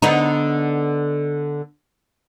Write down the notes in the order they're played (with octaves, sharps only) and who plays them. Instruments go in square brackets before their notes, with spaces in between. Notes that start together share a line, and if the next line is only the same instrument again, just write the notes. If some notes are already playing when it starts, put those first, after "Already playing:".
[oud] D3 B3 D#4